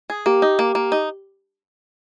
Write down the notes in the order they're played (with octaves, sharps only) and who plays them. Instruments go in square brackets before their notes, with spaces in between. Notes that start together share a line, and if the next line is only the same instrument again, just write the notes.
[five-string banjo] G#4
[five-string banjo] A#3 [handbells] G4
[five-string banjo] D#4
A#3
A#3
D#4